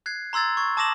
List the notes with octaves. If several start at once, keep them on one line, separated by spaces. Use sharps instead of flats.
F#6 G#6 C7
A#5 C6 E6 G#6 A6
C#6 G#6
A5 D6 D#6 A#6 E7 F#7